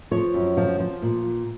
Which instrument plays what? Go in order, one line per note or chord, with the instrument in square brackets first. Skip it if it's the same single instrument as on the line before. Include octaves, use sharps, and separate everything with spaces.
[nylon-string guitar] F3 C#5
F#2
F3
F3
A#2